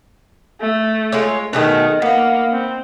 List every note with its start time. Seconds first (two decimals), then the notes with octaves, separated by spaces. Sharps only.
0.61 A3
1.12 G#3 F4 C#5
1.53 B2 D#3 A3 G#4
2.02 A#3 B3
2.52 C4